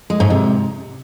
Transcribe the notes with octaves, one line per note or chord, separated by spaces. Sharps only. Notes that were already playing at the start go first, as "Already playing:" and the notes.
G#3
G#2
C3